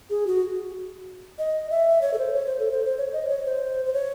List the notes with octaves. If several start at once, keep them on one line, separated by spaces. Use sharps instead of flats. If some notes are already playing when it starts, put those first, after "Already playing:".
G#4
F#4
D#5
E5
C#5
A4
C5
C#5
C5
A4
C5
C5
C#5
D#5
C#5
C5
C5
C#5